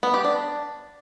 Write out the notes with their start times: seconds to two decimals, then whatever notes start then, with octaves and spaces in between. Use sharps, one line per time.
0.03 B3
0.14 G4
0.25 D4